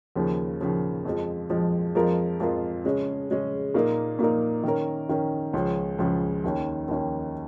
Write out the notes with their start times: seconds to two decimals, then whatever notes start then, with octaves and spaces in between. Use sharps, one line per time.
0.16 D#2 C#3 F3
0.61 D#2 C#3 F3
1.05 F2 F3 G#3
1.50 F2 F3 G#3
1.95 F2 F3 G#3 F4 A#4
2.40 F2 F3 G#3 F4 A#4
2.84 C#3 G#3 C#4
3.29 C#3 G#3 C#4
3.74 A#2 A#3 D#4 A#4
4.19 A#2 A#3 D#4 A#4
4.64 D#3 C#4 A#4
5.09 D#3 C#4 A#4
5.53 C#2 C#3 F3 C#4 G#4
5.98 C#2 C#3 F3 C#4 G#4
6.44 D#2 D#3 C#4
6.88 D#2 D#3 C#4